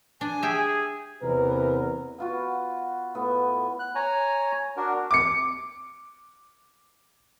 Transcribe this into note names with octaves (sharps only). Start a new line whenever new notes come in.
D4 G#5
G4 G#4 E5
E2 C3 A#4 B4
B3 F4 F#4
A2 B3
F#6
C#5 G#5 A#5
D4 F#4 A#4
D6 C#7